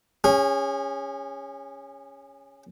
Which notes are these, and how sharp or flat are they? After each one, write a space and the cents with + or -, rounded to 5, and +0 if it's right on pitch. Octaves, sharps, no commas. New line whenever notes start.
C#4 +0 G#4 -35